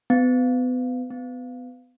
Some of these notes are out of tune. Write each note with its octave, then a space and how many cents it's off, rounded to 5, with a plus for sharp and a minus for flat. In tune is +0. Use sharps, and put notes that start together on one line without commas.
B3 +30
B3 +25